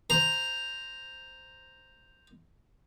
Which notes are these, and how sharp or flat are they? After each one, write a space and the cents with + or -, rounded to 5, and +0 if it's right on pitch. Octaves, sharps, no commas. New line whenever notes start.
C5 +0 A#5 +0